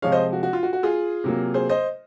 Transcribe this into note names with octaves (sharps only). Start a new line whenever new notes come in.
C3 F3 G#3 C#5 F5
C5 D#5
F#4
F#4
F4
F#4
F#4
F4 G#4
C3 F#3 A#3
G#4 C5
C5 D#5